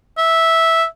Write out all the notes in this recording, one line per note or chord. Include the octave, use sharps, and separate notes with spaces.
E5